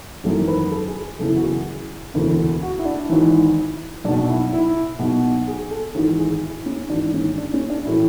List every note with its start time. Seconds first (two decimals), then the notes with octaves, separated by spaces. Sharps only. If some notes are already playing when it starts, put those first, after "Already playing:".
0.24 G#1 F#2 E3 A4
0.48 B4
0.71 A4
0.88 G#4
1.19 F#1 E2 C#3 E3 A4
1.29 E4
1.36 F#4
1.43 G#4
2.14 E1 D2 C#3 E3
2.63 F#4
2.79 E4
2.85 D4
3.09 G#1 G#2 E3
4.04 B1 D4
4.08 B2
4.29 E4
4.53 E4
4.99 B1 B2
5.47 G#4
5.71 A4
5.95 G#1 G#2 E3 A4
6.19 G#4
6.43 E4
6.66 C#4
6.90 G#1 G#2 E3 D4
7.14 C#4
7.38 D4
7.54 C#4
7.70 D4
7.85 A2 E3 E4